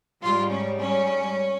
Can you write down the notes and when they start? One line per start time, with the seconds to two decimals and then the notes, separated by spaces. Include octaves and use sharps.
0.22 G#2 G3 F4
0.51 C#4
0.79 C#4